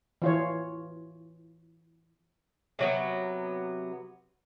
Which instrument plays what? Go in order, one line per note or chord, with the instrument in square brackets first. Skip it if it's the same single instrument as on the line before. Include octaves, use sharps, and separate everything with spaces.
[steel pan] E3 F4 C#5
[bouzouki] C3 F#3 B3